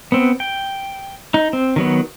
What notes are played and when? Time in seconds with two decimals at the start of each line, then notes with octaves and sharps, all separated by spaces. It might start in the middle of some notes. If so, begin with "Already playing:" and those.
0.12 B3 C4
0.40 G5
1.34 D#4
1.53 C4
1.76 D#3 F#3 B3